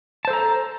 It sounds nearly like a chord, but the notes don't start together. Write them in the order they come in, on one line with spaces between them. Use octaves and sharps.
A5 C5 A4 A#5